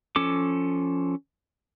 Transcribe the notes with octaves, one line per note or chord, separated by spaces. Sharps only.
F3 C#4 A4 D6